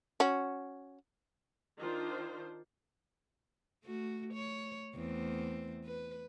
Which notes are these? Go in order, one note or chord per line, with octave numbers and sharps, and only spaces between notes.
C#4 F#4
D#3 D4 F4 C5
A3 F#4
C#5
E2 A3 C4
B4